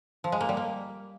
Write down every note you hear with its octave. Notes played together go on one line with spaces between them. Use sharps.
F3
G#3
A#3
G3
A#3